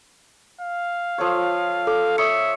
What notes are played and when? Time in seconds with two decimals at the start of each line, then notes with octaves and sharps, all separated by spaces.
0.61 F5
1.18 F3 A4 C#5
1.87 A4 D6
2.18 C#5 E5 C#6 D#6 C#7